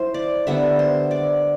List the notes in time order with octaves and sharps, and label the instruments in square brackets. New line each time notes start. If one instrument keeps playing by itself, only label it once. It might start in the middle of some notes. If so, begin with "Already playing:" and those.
Already playing: [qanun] F#3 E4 C5
D5
D3 G3 B3 E5
C5
D5